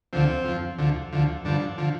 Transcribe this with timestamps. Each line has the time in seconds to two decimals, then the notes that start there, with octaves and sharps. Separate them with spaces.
0.13 D2 D3 F3 C4
0.45 F2 F3
0.78 D2 D3 F3
1.13 D2 D3 F3
1.44 G2 D3 F3 D4
1.78 D3 F3